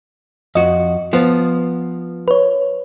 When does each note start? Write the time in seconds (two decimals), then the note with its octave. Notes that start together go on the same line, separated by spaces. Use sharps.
0.55 F2 F#4 D#5
1.13 F3 B3
2.28 B4 C#5